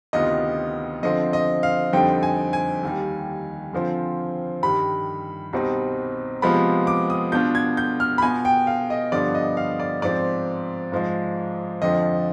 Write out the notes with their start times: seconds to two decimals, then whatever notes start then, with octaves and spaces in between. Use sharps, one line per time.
0.13 D2 C3 D#3 B3 F4 D#5
1.03 D3 F3 C4 D#5
1.33 D#5
1.63 F5
1.93 F2 D3 G3 C4 D#4 G5
2.23 G#5
2.53 G#5
2.83 D#2 D#3 G3
3.73 D3 F3 C4 F4
4.63 G2 D#3 G3 B5
5.53 C2 B2 G3 C4 D#4
6.42 C3 F3 G#3 B3 F4 B5
6.87 D6
7.10 D#6
7.32 B2 B3 D4 F4 G6
7.55 G#6
7.77 G6
8.00 F6
8.18 B5
8.22 B2 B3 F4 G#5
8.45 G5
8.67 F5
8.90 D#5
9.12 G2 D3 F3 B3 F4 D5
9.35 D#5
9.57 F5
9.80 D5
10.02 G#2 F3 C4 D5
10.92 G#2 F3 G#3
11.82 F2 D3 F3 D#5